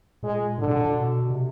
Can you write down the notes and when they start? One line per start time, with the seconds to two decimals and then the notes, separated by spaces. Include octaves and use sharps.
0.23 A#2 G#3
0.59 A2 D3
0.67 B2
0.77 A#2
0.86 B2
1.30 C3